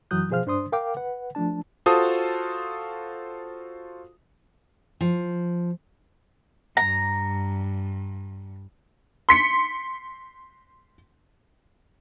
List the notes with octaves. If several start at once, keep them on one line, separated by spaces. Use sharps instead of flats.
F#2 E3 F#3 D#6 F#6 G6
B2 F3 G#4 C5 F5 F6
G2 D4 C5 C6 D#6
A#4 F5 G5 D6
B4 F#5
F3 A3 D4 A5
F4 F#4 A4 C5 A5 D#6
F3
G2 A#5
C6 B6 C#7